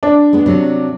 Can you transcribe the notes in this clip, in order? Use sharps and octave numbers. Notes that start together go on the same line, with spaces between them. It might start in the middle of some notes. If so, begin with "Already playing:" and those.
D4
G#3 B3
C3 F#3